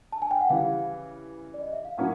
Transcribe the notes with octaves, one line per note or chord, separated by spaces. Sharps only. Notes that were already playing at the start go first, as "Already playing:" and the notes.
A5
G#5
G5
F#5
C#3 E3 G3 F5
D5
D#5
E5
F5
A2 F#3 A#3 C#4 F#5